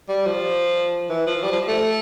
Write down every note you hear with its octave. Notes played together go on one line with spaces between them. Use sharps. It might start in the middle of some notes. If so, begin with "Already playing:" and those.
G3
F3
E3
F3
G3
F3
A3